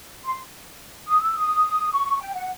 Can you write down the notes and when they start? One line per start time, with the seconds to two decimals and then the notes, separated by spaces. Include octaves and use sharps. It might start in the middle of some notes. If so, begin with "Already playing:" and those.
0.23 C6
1.08 D#6
1.21 E6
1.35 D#6
1.92 C#6
2.20 G5
2.34 F#5